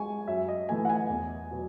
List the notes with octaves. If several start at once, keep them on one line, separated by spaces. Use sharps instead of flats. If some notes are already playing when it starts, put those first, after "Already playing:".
Already playing: G#3 G#5 C#6
F#2 E5
D#5
E3 A3 G#5
F#5
G#5
E2
B2 F#3